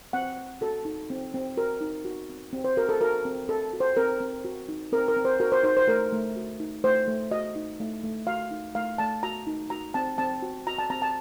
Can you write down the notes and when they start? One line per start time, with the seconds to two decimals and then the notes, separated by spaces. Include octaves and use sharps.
0.13 C4 F#5
0.38 C4
0.61 F#4 A4
0.85 D#4
1.10 C4
1.34 C4
1.57 F#4 A#4
1.81 D#4
2.05 F#4
2.29 C4
2.53 C4
2.64 C5
2.77 F#4 A#4
2.89 A4
3.01 F#4 A#4
3.25 C4
3.48 C4 A4
3.73 F#4
3.80 C5
3.97 C4 A#4
4.20 C4
4.45 F#4
4.69 D#4
4.92 C4 A#4
5.08 A#4
5.17 C4
5.25 C5
5.40 F#4 A#4
5.52 C5
5.64 D#4 C5
5.77 C5
5.87 A3 A#4
6.13 A3
6.36 F#4
6.60 D#4
6.84 A3 C5
7.08 A3
7.31 F#4 D#5
7.56 D#4
7.80 A3
8.03 A3
8.27 F#4 F5
8.51 D#4
8.75 A3 F5
8.98 A3 A5
9.23 F#4 A#5
9.47 D#4
9.70 F#4 A#5
9.94 C4 A5
10.18 C4 A5
10.42 F#4
10.67 F#4 A#5
10.78 A5
10.90 C4 A#5
11.02 A5